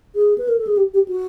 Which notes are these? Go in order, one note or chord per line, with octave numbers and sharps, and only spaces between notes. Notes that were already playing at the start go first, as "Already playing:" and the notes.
G#4
B4
A#4
A4
G#4
G4
G4
F#4